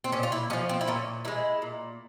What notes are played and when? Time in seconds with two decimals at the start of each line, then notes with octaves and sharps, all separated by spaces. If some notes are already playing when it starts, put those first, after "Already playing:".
0.04 C4
0.12 A#2 C#4
0.23 F4
0.32 E4
0.50 G#3 C#4
0.53 F3
0.69 C4
0.81 E4
0.87 A#2 C#4
1.25 F3 E4
1.28 G#3
1.62 A#2